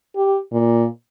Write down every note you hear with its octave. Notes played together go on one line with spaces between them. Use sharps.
G4
A#2